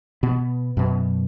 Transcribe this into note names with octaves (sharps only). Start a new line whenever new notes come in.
B2 B3
F#2 B2